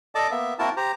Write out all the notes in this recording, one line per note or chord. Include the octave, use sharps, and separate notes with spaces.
A4 D5 D#5 A5 D6
A#3 B3 E5
A#3 C4 E4 F#4 A#4 A5
G4 C5 A#5